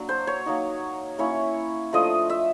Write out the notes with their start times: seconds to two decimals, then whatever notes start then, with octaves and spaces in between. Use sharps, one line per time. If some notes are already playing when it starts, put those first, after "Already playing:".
Already playing: F#3 A#3 D4
0.09 C5
0.27 C#5
0.46 F#3 A#3 D#4
1.18 A#3 C#4 E4 C#5
1.93 F3 A3 D4 F4 D#5
2.30 E5